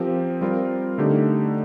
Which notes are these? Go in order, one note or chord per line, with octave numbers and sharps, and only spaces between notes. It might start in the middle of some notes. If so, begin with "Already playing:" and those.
Already playing: F3 C4 G4 A#4
G3 C4 F4 A#4
D3 A3 D#4 G4